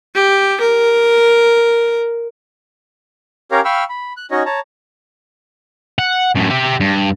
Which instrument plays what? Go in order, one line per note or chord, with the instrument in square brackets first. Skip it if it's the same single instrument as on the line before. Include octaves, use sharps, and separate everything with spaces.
[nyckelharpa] G4
A#4
[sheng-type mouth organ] C#4 G4 A#4 C#5 F5 A#5
F5 G5 B5 C#6 E6 F6
B5
F#6
C#4 D#4 F#4 C#5 D#5
C#5 A5 A#5
[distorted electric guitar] F#5
F#2 A2
G4 E5
G2